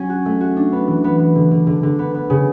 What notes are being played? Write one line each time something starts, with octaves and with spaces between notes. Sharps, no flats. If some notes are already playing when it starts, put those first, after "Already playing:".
Already playing: F#3 C#4
F#4
A3
F#4
D4
B3
E3
B3
B3
D3
D3
D3
D3
B3
B3
C#3